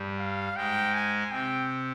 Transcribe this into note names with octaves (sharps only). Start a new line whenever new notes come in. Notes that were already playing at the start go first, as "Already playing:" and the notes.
Already playing: G2 G3
F5
G#2 G#3 G5
G#5
C3 C4 G5